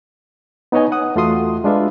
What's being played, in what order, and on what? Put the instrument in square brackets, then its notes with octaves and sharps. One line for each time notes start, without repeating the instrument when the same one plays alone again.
[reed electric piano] B3 D#4 B4 C#5 D#5 G#5
F#5 D#6
E2 A3 F4 F#4 C6 D#6
G#3 D4 F4 B4 E5